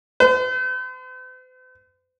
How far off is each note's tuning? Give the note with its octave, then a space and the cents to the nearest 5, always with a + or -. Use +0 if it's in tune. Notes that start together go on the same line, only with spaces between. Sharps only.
C5 -45